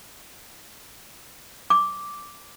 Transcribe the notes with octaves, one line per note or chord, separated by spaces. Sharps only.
D6